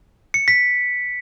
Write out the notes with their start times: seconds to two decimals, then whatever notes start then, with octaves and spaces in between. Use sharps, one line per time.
0.34 C#7
0.48 B6